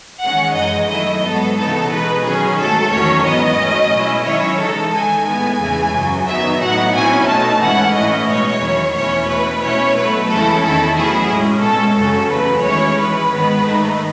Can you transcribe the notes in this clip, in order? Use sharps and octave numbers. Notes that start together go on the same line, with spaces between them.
D#3 G#3 C#4 F#5
F#2 E3 G#3 D#4 D#5
D#3 F#3 A3 E4 D#5
G#2 F#3 B3 A4
C#3 E3 B3 D#4 A4
B2 G#3 D#4 B4
D#3 F#3 C#4 G#4
G#2 F#3 A3 A4
E2 D#3 F#3 C#4 C#5
G#2 E3 B3 D#5
G#2 F#3 A3 C#4
B2 G#3 C#4 E4
D#3 F#3 C#4 E4 C#5
C#3 E3 G#3 D#4 A4
D#3 G#3 D#4 G#5
A2 G#3 B3 G#5
E2 C#3 E3 G#3
F#2 C#3 F#3
D#3 F#3 B3 D#4 E5
A2 F#3 B3 D#4 F#5
B2 F#3 C#4 E4 G#5
B2 A3 D#4 A5
G#2 E3 G#3 C#4 E4 F#5
A2 E3 A3 C#4 E4 D#5
B2 G#3 D#4 C#5
E2 D#3 F#3 C#4 E4
E2 B2 A3 C#4 E4 C#5
B2 A3 E4 B4
B2 A3 C#4 E4 C#5
B2 F#3 A3 B4
E2 C#3 G#3 C#4 E4 A4
E2 D#3 A3 E4 A4
B2 F#3 C#4 E4 G#4
A2 G#3 C#4
B2 G#3 C#4 A4
F#2 C#3 F#3 C#4 A4
E2 C#3 F#3 A3 B4
D#3 G#3 C#4 E4 C#5
A2 E3 G#3 B4
G#2 D#3 G#3 B3
G#2 D#3 A3 D#4